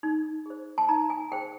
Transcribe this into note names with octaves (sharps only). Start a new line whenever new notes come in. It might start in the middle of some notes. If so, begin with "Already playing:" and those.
D#4
G#4 C5
A5
D#4 A#5
G#5
G#4 C5 G5